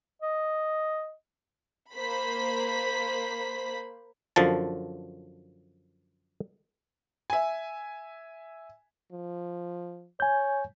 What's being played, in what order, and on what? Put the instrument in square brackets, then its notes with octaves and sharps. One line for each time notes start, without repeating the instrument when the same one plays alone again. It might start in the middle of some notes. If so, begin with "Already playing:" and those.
[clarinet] D#5
[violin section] A#3 C5 B5 B6
[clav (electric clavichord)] F#2 D3 F3 A5
[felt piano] E5 G#5
[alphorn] F3
[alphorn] C#5 [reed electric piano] G#5 G6